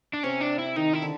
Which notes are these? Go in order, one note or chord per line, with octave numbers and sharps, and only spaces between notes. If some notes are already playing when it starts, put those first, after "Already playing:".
D4
C3 C#4
D4
E4
D#3 D#4
E4
D3